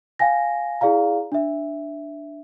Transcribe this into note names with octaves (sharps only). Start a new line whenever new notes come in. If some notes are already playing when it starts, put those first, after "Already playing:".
F5 G5 G#5 A#6
E4 G#4 D5 F5 A#5
D4 E5